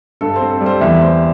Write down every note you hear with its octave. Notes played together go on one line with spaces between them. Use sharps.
G2 A4
C4 C5
A4
G3
C5
E2 E5
G3 C5